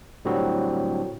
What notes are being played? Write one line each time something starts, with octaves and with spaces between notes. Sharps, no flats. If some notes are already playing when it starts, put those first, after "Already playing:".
A2 D3 F#3 G3 C4 F#4